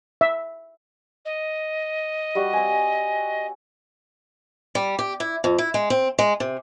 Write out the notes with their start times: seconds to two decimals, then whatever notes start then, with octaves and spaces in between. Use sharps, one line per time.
0.21 E5
1.25 D#5
2.35 G3 F#4
2.53 C4 G#5
4.75 G3
4.99 G4
5.20 E4
5.44 F2
5.58 E4
5.74 G#3
5.90 C4
6.19 G#3
6.40 C3